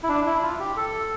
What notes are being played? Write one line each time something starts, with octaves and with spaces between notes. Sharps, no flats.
E4
D4
E4
F4
G4
A4